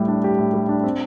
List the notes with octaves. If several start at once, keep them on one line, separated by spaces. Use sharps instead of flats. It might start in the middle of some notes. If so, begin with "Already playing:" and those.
Already playing: A2 G3 G4
D4
G4
A2
G3
D4
C4